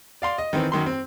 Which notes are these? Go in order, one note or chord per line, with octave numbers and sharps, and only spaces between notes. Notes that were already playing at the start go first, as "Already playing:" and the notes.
D5 F5 C6
D#5
D#3 E3 C4
F#2 D#3 C6
C4